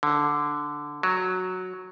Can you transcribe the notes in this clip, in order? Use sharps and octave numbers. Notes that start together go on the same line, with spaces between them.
D3
F#3